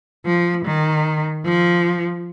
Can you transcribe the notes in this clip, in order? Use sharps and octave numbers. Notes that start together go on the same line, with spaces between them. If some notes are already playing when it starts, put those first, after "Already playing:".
F3
D#3
F3